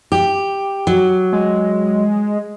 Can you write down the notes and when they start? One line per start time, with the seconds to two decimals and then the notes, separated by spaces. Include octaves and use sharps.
0.12 G4
0.87 F#3
1.33 G#3